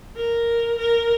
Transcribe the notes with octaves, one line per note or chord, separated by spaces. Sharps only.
A#4
A#4